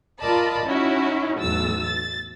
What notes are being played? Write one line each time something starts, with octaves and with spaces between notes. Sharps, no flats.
F4 A#4 D5 D#5 A5 B5
C#4 D#4 E4 F#4
B1 E2 A2 E6 A6
A6